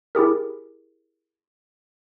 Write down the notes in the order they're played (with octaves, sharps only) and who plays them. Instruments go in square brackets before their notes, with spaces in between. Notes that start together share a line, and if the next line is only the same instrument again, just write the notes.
[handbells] E4 G4 G#4 A#4